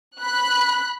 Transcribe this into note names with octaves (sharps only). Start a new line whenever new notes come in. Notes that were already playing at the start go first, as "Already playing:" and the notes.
B5 F#6